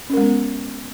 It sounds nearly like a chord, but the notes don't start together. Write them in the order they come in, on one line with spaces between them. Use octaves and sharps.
C#4 A#4 G#3 B3